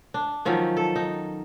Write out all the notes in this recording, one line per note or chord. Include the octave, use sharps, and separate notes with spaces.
D4
D#3 F3 F#3 C#4
A4
D#4